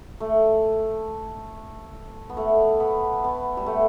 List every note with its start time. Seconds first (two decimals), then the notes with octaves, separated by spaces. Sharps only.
0.20 A3
2.30 B3
2.37 A3
2.80 B3
3.24 B3
3.57 G3
3.66 A3